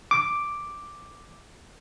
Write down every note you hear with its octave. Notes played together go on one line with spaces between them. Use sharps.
D6